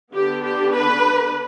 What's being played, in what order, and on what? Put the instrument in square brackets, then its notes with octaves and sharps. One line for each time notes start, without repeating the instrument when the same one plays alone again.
[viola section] D3 B3 D4 G4
G4
B4